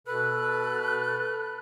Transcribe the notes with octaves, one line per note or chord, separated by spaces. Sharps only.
B2 A4 B4 F#6